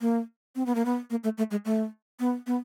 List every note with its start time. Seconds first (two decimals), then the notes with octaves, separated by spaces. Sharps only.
0.01 A#3
0.56 C4
0.66 B3
0.75 A#3
0.85 B3
1.10 A#3
1.24 A3
1.38 A3
1.51 G#3
1.65 A3
2.20 B3
2.47 B3